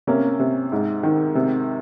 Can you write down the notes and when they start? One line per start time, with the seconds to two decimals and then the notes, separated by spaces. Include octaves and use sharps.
0.07 C3 A#3 C#4
0.39 C3
0.72 G#2
1.03 D#3
1.35 C3